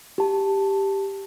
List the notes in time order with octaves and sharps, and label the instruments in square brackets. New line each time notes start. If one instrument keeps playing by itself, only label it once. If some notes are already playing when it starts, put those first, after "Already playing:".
[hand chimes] G4 A5